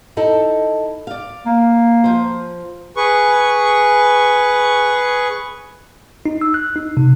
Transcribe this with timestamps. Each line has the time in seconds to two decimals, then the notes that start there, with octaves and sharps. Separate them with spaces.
0.17 D#4 E4 A4
1.07 D5 F5
1.46 A#3
2.04 F3 C5
2.97 G#4 B4 C#6
6.26 D#4
6.41 E6
6.54 F#6
6.76 D#4
6.97 C3